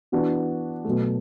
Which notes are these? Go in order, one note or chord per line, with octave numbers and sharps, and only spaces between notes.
E3 B3 D4 F#4
B2 F#3 A3